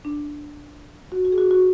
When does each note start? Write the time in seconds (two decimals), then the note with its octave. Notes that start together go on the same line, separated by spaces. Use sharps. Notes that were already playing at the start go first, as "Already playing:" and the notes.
0.05 D4
1.12 F#4
1.25 F#4
1.32 G#4
1.38 F#4
1.51 F#4